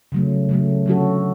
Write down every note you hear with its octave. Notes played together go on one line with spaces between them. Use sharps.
C#3 F#3 A3
C#3 F#3 A3
D3 F#3 C#4 F#4 A4